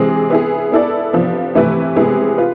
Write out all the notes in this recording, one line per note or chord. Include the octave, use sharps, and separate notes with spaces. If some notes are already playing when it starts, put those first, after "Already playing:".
Already playing: C3 E3 G#3 C4 G#4
B3 E4 G#4
B3 E4 A4 D5
C3 F3 B3
C3 E3 A3 E4 B4
C3 G#3 B3 E4 G#4
F4 B4